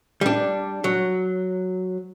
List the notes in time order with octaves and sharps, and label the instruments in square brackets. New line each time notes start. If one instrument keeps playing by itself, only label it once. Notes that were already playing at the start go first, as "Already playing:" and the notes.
[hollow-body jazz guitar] G3 D4
F#3